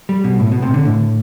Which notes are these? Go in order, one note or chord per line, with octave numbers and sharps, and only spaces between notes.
G3
B2
A2
B2
C3
D3
A2